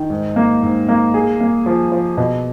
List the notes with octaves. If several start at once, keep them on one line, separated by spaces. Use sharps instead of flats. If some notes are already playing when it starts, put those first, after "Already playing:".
Already playing: D#3
G#2
A#3
G#2
A#3
G#4
A#3
F3
F3
B2